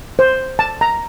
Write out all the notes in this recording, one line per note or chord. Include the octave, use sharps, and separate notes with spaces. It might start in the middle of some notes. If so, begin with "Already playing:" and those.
C5
A5
A#5